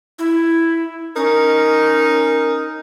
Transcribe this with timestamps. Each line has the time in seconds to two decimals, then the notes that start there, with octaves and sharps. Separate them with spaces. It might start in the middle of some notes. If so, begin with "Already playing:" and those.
0.19 E4
1.16 C#4 D#4 A#4